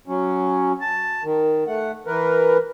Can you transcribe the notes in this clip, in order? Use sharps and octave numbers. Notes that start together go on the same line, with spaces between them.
F#3 C#4
A5
D#3
A3 F#5
E3 A#4 B4